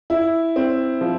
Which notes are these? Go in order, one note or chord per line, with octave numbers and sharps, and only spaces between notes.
E4
C4
F3